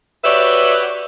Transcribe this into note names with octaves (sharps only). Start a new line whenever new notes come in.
F#4 G4 B4 C#5 D5 E5